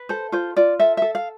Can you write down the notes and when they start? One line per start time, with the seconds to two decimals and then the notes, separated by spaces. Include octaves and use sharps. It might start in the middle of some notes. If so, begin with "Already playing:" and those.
Already playing: B4
0.09 A4 C5
0.32 F4 C5
0.56 F4 D5
0.79 A4 E5
0.97 A4 E5
1.15 F5